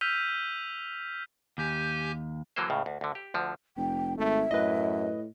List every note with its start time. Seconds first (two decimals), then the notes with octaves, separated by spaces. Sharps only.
0.01 E6 F6 G6 B6 D#7 F7
1.58 D#2 G4 G#5 G6
2.56 D3 E3 F#3 A#3 C5
2.70 C#2 A2 C#3
2.86 D2
3.01 D2 D3
3.15 G4
3.34 D2 D3 F3
3.77 F1 G5
4.18 G#1 A3 E5
4.51 F#2 A2 B4 D#5